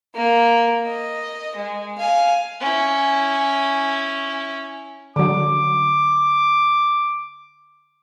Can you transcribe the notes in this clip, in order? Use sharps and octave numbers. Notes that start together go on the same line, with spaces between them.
A#3
D#5
G#3
F5 G#5
C#4 E4
D3 F#3 D6